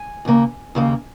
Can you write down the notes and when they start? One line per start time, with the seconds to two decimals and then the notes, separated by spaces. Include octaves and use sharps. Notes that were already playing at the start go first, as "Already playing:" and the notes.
Already playing: G#5
0.25 D#2 C#3 A#3
0.75 D#2 C#3 A#3